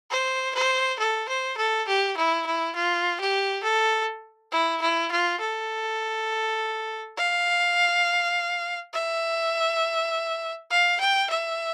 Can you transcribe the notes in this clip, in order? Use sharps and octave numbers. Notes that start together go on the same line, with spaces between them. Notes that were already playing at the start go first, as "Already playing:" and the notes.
C5
C5
A4
C5
A4
G4
E4
E4
F4
G4
A4
E4
E4
F4
A4
F5
E5
F5
G5
E5